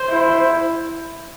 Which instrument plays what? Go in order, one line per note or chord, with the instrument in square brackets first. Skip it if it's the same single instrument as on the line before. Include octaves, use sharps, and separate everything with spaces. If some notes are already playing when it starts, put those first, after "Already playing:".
Already playing: [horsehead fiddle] C5
[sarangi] E4